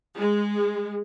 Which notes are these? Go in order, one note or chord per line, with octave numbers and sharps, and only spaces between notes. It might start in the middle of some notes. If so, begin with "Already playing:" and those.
G#3